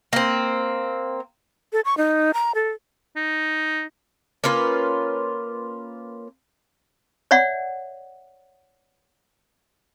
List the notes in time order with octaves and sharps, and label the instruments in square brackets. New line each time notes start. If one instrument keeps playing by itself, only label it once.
[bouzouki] A#3 C4
[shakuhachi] A4
C#6
D#4
A#5
A4
[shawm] D#4
[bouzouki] A#3 C#4 F4 B4
[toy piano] C#5 D5 E5 F#5